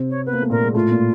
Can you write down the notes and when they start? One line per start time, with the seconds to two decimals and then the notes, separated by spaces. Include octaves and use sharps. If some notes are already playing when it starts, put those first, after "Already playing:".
Already playing: C3 C4
0.10 C#5
0.26 B3 B4
0.33 A#3
0.42 A3
0.49 A#2 A#3 A#4
0.63 G#3
0.74 A2 A3 F4
0.90 A#2 A#3